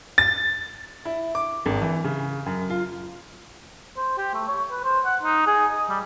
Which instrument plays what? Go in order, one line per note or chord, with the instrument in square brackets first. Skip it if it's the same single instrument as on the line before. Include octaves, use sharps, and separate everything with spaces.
[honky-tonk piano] A6
[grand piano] E4
D6
G#1
E3
C#3
F#2
F4
[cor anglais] C5
G4
A3
C#5
B4
C5
F#5
D#4
G#4
D#5
G3